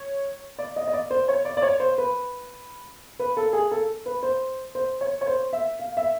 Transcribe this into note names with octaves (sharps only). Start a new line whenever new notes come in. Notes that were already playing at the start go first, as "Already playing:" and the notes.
Already playing: C#5
D5
D#5
D#5
D5
C5
C#5
D5
D5
C#5
C5
B4
B4
A4
G#4
A4
B4
C5
C5
C#5
C#5
C5
E5
F5
E5